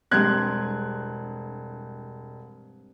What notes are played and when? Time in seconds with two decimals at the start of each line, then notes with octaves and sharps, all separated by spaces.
0.11 E1 G2 G#3 C4 F#6 G#6